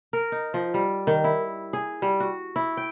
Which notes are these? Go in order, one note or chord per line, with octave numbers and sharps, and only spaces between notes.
A#4
D#4
F3
G3
D#3
E4
G#4
G3
F#4
E4
G5